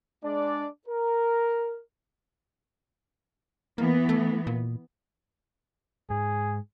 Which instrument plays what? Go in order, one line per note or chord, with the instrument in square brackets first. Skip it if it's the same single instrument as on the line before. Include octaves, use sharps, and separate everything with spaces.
[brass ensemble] G#3 D4 D5
A#4
[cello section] E3 B3 [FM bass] A#3
[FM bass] A3
A#2
[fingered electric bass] G#2 [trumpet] G#4